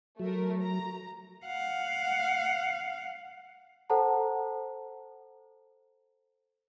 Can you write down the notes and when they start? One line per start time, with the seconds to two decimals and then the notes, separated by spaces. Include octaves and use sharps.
0.20 F#3 A3 A#4
0.61 A#5
1.46 F5 F#5
3.90 A4 C5 F#5 A5 A#5